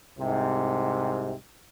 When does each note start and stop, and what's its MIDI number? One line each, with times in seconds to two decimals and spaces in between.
0.19 1.35 36
0.19 1.35 44
0.19 1.35 48